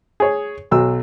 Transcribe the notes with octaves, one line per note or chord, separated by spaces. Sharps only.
G#4 C#5
B1 F#3 E6